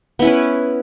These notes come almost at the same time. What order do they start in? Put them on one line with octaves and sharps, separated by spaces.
B3 E4 C#4 B4